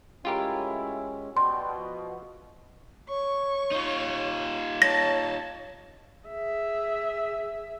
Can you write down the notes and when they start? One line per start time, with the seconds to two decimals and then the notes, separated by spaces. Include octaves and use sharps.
0.25 A2 G#3 C#4 E4 F4 G4 A#4
1.37 B2 D5 G5 C6
1.76 F3
3.09 C#5 C#6
3.71 D#4 F4
4.82 C#5 A5 A#6
6.29 G#4 E5